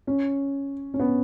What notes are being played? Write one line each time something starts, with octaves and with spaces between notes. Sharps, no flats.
C#4
C#4
B3